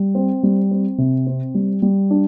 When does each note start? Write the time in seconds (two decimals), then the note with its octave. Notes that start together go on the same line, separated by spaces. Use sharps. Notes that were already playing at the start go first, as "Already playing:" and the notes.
Already playing: G3
0.15 C4
0.43 G3
0.71 C4
0.98 C3
1.27 C4
1.55 G3
1.82 G3
2.11 D4